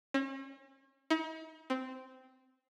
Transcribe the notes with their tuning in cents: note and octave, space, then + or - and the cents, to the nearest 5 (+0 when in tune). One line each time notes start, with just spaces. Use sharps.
C#4 -40
D#4 +45
C4 -10